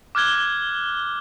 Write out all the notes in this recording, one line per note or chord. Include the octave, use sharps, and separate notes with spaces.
D6 F6 F#6 G#6 G7